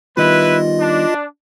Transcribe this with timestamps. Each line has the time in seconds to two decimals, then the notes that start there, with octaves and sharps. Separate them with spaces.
0.17 D#3 G3 B3 E4 F4 B4 D#5
0.80 D4